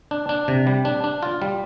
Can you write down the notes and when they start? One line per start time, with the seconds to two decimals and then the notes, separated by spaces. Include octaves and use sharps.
0.11 D4
0.29 D4
0.48 C3
0.67 G3
0.85 D4
1.04 D4
1.23 F4
1.42 G3